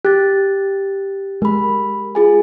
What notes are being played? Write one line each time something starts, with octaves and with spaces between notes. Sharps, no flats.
G4 F#6 A6
G#3 A#4 B5
F4 G#4 G#5